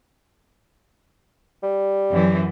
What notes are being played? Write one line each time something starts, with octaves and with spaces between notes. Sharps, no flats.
G3
F#2 E3